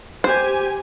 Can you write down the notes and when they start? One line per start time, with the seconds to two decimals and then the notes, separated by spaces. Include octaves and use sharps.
0.24 G4 C5 G#5